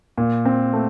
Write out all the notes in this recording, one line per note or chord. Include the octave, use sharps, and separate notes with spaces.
A#2
C4
A3